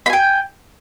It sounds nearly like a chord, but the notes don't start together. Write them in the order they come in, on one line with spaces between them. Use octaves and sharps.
B5 G#5 G5